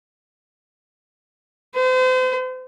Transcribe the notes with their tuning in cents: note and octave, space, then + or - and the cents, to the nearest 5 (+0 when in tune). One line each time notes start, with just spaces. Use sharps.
C5 -40